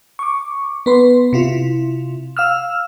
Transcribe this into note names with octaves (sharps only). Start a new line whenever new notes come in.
C#6 D6
B3 B4 C6
C3 E4 F4
F5 E6 F6